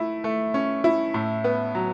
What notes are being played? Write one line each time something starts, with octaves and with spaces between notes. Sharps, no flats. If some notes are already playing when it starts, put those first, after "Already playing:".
Already playing: A3 E4
A3
C#4
E4
A2
B3
F#3